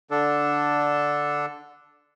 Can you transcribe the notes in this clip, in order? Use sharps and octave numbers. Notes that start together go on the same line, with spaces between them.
D3 D4 A4